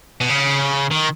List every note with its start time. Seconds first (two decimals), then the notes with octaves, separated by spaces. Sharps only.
0.21 B2
0.29 C#3
0.92 D#3